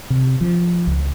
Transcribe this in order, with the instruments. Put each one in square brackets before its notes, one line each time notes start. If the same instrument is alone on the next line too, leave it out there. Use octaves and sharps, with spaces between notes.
[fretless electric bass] C3
F3
C#2